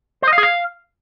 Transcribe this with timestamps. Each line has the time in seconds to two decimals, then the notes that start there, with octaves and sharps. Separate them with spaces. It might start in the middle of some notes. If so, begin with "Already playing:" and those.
0.22 C5
0.28 D#5
0.33 F5
0.38 G#4
0.43 F5